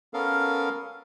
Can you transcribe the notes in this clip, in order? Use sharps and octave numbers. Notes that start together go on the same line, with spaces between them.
B3 C#4 A4 A#4 F5